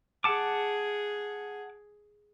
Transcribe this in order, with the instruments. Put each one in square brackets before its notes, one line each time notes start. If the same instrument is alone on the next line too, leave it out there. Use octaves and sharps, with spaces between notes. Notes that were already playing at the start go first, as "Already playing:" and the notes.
[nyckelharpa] G#4 [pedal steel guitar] F#5 A5 D6